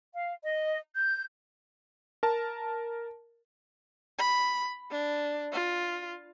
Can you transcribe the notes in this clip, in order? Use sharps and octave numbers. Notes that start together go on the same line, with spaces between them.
F5
D#5
G6
A#4 A5
B5
D4
F4